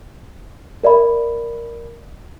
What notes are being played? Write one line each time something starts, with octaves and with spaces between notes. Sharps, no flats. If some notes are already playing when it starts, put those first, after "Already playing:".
A#4 D5 E5 B5